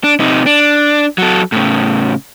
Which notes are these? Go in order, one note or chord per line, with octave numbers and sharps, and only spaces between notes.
D4
C3 D#4
D4
F#3 A4
A2 C#3